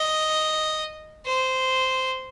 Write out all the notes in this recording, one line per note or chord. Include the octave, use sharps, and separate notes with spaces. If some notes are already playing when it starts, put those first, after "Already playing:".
Already playing: D#5
C5